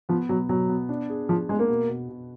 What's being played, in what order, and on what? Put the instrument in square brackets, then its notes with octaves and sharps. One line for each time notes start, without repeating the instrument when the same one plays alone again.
[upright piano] F3 [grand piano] B3
[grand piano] B2 [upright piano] F#3
[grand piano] B2 [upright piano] F#3
[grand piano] B3
D4
G#4
[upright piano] F3 [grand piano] G#4
[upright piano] G#3 [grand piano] B3
[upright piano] A#3
[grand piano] B2
B2
B2